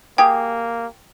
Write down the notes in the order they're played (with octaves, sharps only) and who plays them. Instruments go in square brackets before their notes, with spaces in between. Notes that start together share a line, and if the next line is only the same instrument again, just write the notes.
[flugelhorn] A#3 [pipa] G4 G#4 [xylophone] G5